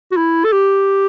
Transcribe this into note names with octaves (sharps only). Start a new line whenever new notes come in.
F#4
E4
A4
G4